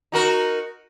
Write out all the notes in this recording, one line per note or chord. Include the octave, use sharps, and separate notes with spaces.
D#4 F#4 A#4